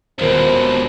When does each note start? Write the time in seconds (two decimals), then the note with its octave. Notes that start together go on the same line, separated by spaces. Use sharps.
0.19 D#1 C#2 B2 C5 E7